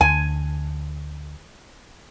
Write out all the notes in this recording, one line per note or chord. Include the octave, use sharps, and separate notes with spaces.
D2 G#5